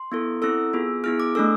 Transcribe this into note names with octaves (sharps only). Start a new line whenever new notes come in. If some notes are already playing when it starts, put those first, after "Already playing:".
Already playing: C6
B3 E4 A4
C4 E4 A4 E6
B3 F4 G#4
B3 E4 G#4 F6
D6
A3 D4 A4 E6